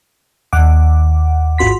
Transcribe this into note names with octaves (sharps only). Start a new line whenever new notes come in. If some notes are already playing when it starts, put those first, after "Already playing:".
D#2 F#5 D6
G#1 F4 F#4 C6 B6